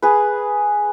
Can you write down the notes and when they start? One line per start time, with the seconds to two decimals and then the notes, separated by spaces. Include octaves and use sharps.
0.02 G#4 B4